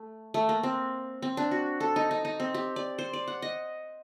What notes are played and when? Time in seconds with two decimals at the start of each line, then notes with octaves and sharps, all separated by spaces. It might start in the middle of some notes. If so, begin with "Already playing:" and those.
Already playing: A3
0.34 A3
0.49 A#3
0.63 C4
1.22 C4
1.37 D4
1.51 F#4
1.80 A4
1.96 D#4
2.11 D#4
2.25 D#4
2.40 C4
2.54 G4
2.76 D5
2.98 C5
3.13 D5
3.28 F#5
3.42 D#5